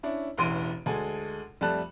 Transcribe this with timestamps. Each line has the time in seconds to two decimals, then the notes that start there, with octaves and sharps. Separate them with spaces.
0.03 C#4 D4 E4
0.38 E1 A1 E3 C6 D7 D#7
0.86 D2 G#3 A4 G#5
1.61 F2 G3 A3 A5 F#6